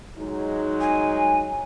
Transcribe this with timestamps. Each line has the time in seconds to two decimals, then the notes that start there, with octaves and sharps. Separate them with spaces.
0.19 F#3 G#3 D#4
0.80 G#5